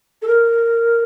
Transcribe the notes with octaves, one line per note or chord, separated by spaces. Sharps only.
A4
A#4